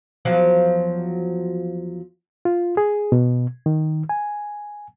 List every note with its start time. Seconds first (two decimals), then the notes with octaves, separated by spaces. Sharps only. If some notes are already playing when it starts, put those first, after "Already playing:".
0.25 E2 F3 F#3
2.45 F4
2.77 G#4
3.12 B2
3.66 D#3
4.09 G#5